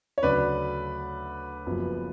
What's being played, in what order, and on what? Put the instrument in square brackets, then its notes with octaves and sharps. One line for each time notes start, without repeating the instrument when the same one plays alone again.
[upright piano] C#5
[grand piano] D2 C#3 F#3 A3 C#4 [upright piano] B4 D5
[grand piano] F#1 F#2 F3 B3